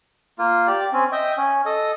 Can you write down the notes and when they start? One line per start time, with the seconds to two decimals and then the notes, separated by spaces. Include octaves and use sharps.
0.38 A#3 F4
0.67 G4 D5
0.93 C4 C#4
1.12 D#5 E5 G5
1.37 C#4
1.65 A4 D#5